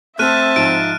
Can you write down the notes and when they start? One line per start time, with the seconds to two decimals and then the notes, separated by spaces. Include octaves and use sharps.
0.19 A3 C4 A4 E5 A5 F6 F#6 D#7
0.56 G#2 F3 D7